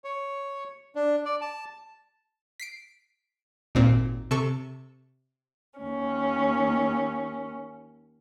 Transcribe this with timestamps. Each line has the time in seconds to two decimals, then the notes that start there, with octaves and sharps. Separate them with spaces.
0.04 C#5
0.96 D4
1.25 D5
1.41 A5
2.60 B6 C7 D7
3.75 G#1 D#2 A#2 C4
4.31 C3 A4 C#6
5.80 D#2 C#4